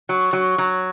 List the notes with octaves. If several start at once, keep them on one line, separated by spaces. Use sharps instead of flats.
F#3
F#3
F#3